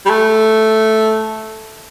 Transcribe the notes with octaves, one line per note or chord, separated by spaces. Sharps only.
G3
A3